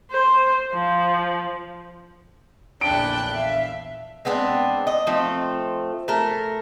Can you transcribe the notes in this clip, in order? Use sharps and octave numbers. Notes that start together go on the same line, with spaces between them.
C5
F3
A#1 E2 D3 D4 E4 G5 F#6 D7
E5 F5
G#3 B3 C4 D4
D#5
F3 A3 C4
A3 A4 A#4